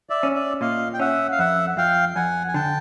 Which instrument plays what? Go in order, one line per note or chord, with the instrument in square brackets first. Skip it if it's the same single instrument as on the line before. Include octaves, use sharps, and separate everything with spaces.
[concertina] D5 E5
[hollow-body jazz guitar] C#4
[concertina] D5 E5
[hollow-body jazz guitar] A#2 [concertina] D#5 F5
[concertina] G5
[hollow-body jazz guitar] C#4 [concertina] E5 F#5
[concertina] F5
[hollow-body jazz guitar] F2 [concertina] E5 F#5
[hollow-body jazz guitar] F2 [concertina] F5 G5
[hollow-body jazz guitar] F2 [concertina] F#5 G#5
[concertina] G#5
[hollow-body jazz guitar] D3 [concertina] G5 A5